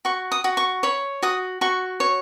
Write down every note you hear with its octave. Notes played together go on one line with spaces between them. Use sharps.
F#4 C#6
D#6
F#4
C#6
C#5 B5
F#4 D#6
F#4 C#6
C#5